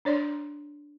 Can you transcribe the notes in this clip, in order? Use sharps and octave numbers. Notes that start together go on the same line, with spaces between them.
D4 C#5 D5 C6